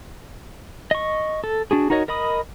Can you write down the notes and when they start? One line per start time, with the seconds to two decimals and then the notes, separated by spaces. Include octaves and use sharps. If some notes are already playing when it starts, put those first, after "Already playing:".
0.91 D#5 C#6
1.44 A4
1.71 D4 F#4 G#4
1.90 D#4 F#4 A#4 C#5 D#5
2.08 A#4 D#5 B5 D#6